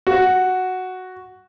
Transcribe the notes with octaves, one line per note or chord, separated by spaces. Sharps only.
F#4